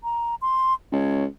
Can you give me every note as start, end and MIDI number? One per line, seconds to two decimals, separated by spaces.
0.04 0.35 82
0.42 0.74 84
0.92 1.25 37
0.92 1.24 73